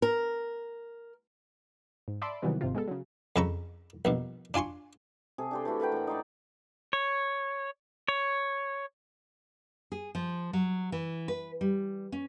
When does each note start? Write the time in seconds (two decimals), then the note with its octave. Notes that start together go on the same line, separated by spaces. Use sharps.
0.02 A#4
2.08 G#2
2.22 D5 E5 A5 B5 C6 D6
2.42 C3 D#3 E3 F#3 G3 B3
2.61 G#1 G#2 C3 F4
2.75 G#3 B3 A4
2.88 C#3 F#3
3.36 F2 C#3 A4 A#5 B5 C#6
4.05 A#1 G2 B2
4.54 D4 F4 G#5 C6 C#6
5.38 C3 G#4 A4
5.51 D4 G4 C5
5.65 E3 A3 E4 F#4
5.80 A#4 B4 F#5 G5
5.92 A2 A#5
6.07 D#4 C5 D5
6.93 C#5
8.08 C#5
9.92 G#4
10.15 F3
10.53 F#3
10.92 E3
11.28 B4
11.61 G3
12.12 C#4